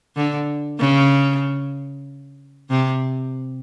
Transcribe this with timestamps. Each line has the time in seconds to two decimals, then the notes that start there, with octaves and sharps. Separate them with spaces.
0.16 D3
0.79 C#3
2.70 C3